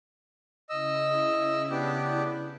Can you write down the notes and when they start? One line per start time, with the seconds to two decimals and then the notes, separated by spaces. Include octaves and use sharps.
0.69 C#3 E4 D#5 E6
1.70 B3 D4 G4